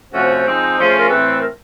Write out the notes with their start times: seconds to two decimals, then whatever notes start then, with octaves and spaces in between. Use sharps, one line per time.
0.12 C3 F3 A3 C#4 F#4 C5
0.45 F3 G#3 C4 D#4
0.77 F3 A3 C#4 F4 G#4
0.99 A#4
1.09 A2 E3 A3 C4 B4
1.41 A#4